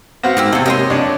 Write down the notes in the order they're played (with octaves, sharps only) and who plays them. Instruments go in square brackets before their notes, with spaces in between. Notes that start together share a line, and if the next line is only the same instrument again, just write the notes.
[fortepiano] B3 C4 F#4 [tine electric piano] F5 A#6
[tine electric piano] G#2 [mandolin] A#3 G4 E6
[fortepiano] E2 [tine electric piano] C3 [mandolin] A4 C#5
[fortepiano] A#3 C#4 G4 [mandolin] D#5 G5 C6
[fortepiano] F2 D4 C#5